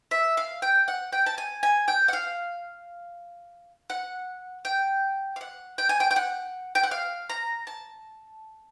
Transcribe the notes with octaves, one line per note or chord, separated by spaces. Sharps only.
E5
F5
G5
F#5
G5
A5
G#5
G#5
G5
F#5
F5
F#5
G5
F5
F#5
G5
G#5
G5
G5
F#5
G5
F#5
F5
A#5
A5